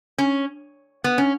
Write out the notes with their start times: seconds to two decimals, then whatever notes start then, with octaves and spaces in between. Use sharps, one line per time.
0.18 C#4
1.04 B3
1.18 C#4